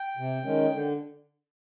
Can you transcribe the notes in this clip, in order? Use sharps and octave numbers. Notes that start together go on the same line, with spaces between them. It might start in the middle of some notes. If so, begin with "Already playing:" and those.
Already playing: G5
C3
D#3 G#3 C#4
D3